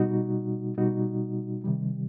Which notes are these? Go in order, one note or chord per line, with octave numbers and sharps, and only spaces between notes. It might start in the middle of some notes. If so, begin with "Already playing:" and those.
Already playing: B2 G3 D#4 F#4
B2 G3 D#4 F#4
C3 D#3 G3